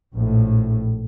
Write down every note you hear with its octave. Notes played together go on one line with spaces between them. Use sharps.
A#1 A2